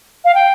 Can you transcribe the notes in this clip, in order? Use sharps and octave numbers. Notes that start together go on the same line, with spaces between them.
F5
G5